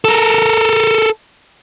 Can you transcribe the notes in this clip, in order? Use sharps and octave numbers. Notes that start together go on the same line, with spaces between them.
A4 A#4